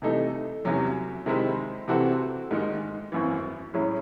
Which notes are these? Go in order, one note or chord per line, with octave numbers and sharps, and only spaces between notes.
C3 E3 A3 D#4 A4
E2 C3 F#3 C#4
C3 D#3 G#3 C4 E4
C3 E3 C4 F#4 A4
G#2 D#3 G#3 D#4
G#1 F#2 E3
A2 F#3 C#4 E4 G#4